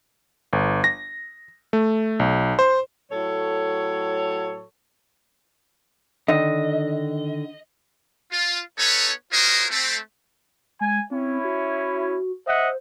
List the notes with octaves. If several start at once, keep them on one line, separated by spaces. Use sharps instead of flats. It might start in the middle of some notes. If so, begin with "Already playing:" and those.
G1
A#6
A3
B1
C5
A2 F#3 A4 C#5
D3 D#3 D#5
F4
B3 D#4 A4 B4 C#5
F4 F#4 A#4 C5 C#5 D#5
A3 C4
G#3 G#5
C4 C#4 E4
F#4
C5 D#5 E5 F#5